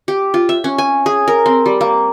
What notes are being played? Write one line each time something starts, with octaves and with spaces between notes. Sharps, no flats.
G4
F4
E5
C#4
G#5
G#4
A#4
C4
G3
A#3